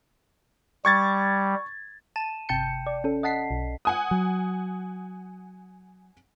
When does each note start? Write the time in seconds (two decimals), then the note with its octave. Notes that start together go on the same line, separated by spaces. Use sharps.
0.85 G3 C#6 G#6 A6
2.16 A5 D#7 E7
2.49 G1 C3 G5 A5 G6 C#7
2.87 D5
3.04 C#4 A4
3.23 D#5 F#5 A5 B6 C7
3.51 B1
3.85 F#5 G#5 D#6
4.11 F#3